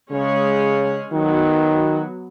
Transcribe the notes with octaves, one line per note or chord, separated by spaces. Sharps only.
C#3 G#3 C#4 G#4 C#5
D#3 F#3 B3 F#4